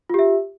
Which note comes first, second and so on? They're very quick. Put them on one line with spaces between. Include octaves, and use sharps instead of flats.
F4 G4 E5